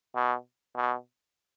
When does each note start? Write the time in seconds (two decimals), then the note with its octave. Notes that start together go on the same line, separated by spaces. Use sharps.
0.15 B2
0.76 B2